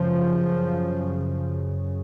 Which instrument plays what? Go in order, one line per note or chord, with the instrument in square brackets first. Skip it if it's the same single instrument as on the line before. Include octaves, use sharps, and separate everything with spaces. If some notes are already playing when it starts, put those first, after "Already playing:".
Already playing: [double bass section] F#2 C#3 F3